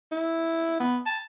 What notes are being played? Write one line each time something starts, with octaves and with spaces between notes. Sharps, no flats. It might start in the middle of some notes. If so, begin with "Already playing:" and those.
E4
B3
A5